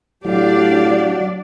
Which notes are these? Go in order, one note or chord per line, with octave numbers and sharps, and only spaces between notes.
A2 F#3 D4 G4 D5 F5